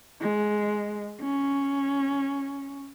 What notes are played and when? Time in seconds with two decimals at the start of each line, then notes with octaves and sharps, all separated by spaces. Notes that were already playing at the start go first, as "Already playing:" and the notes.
0.21 G#3
1.21 C#4